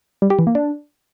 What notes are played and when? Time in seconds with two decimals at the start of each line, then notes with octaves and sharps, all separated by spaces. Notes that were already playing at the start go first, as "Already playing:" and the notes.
0.22 G3
0.30 G4
0.39 E3
0.47 A#3
0.55 D4